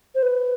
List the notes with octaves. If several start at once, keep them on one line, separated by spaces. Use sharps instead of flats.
C5
B4